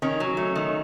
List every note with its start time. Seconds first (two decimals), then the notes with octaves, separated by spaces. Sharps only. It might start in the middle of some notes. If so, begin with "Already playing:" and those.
0.02 D#3 C#4
0.20 F#3
0.37 A3
0.55 D#3